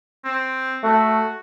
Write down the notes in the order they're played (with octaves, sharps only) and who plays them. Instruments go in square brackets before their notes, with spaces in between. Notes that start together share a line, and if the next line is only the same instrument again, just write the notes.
[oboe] C4
[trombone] A3 [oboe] F#4